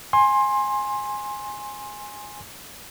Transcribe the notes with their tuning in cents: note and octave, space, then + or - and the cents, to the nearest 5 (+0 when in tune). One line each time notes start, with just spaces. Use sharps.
G#5 -5 C6 +20